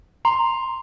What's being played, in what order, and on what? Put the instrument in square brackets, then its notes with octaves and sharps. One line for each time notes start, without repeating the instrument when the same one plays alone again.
[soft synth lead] A#5 [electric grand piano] C6